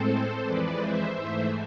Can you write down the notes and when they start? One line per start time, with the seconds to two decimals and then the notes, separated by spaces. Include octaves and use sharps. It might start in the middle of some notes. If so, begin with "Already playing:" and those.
Already playing: A2 G#3 C4 A4 C5
0.41 F2 E3 G#3 B4 D5
0.77 C5 E5
1.13 G#2 E3 A3 C5 E5